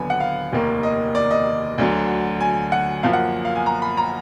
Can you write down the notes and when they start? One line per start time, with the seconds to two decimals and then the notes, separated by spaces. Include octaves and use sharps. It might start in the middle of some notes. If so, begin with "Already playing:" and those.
Already playing: D#2 D3 F#3 B3 G#5 B5
0.10 F#5
0.20 F5
0.52 F1 D#2 D#3 A#3
0.83 D#5
1.15 D5
1.31 D#5
1.78 D2 D3 F#3
2.41 G#5
2.72 F#5
3.03 F#2 F3 A#3 F5
3.13 F#5
3.45 F5
3.55 G#5
3.66 A#5
3.82 B5
3.97 A#5